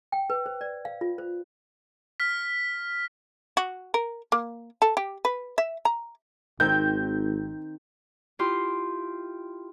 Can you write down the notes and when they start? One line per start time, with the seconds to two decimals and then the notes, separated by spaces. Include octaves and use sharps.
0.12 G5
0.30 B4
0.46 C5
0.61 D5
0.85 F5
1.01 F4
1.18 C5
2.20 F6 B6
3.57 F#4
3.94 A#4
4.32 A#3
4.82 A4
4.97 G4
5.25 B4
5.58 E5
5.85 A#5
6.60 G#1 D#3 C4 G6
8.39 E4 F4 G4 C6